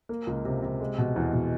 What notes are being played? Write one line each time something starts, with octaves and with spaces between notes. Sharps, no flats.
A#3
C#2
C3
C3
G#3
B2
E2
B2